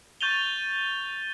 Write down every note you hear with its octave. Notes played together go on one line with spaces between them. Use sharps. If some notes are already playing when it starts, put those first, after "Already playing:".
C#6 G6 A6 D#7 F7 G7